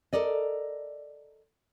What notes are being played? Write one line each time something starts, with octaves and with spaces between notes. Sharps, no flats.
A4 A#4 D5 D#5